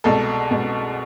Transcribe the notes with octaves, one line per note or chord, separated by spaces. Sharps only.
C2 B2 G#3 A4
B2 G#3